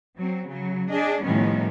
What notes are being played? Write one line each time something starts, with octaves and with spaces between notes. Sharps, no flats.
F#3 C4
C#3 F#3
D4 G#4 D#5
A2 D#3 F3 G3 B3 C#4